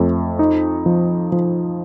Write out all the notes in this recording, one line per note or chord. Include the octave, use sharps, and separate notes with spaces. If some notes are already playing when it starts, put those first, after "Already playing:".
Already playing: F2 A3
D#4
F3
F3